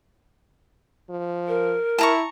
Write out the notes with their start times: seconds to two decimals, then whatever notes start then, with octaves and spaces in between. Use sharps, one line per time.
1.10 F3
1.48 A#4
1.98 E4 A5 A#5 C#6